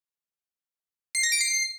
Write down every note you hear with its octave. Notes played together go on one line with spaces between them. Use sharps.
C7
A#6
D7
C7